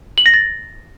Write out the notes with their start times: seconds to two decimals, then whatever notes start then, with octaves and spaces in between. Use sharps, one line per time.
0.18 F#7
0.26 A#6
0.34 A6